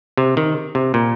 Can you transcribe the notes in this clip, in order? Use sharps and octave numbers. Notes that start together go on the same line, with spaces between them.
C3
D#3
C3
A#2